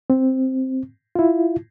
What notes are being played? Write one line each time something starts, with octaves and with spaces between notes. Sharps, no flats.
C4
E4 F4